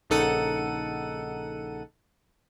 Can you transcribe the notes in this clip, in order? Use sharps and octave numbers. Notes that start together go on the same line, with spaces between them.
A#1 C#3 D#4 A4 F#5 D#7